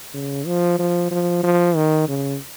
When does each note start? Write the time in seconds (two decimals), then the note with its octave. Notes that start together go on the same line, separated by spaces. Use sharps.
0.14 C#3
0.46 F3
0.79 F3
1.11 F3
1.43 F3
1.76 D#3
2.08 C#3